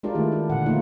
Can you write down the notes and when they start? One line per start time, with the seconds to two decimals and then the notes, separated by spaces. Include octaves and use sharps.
0.03 G#3 D4 F4 G4 A#4 D5
0.15 D#3 A3 E4
0.32 D4
0.50 A#2 D3 F#5
0.66 D3 F3 A3 A#3 D#4 F4